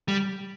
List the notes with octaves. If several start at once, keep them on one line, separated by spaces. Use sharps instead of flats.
G3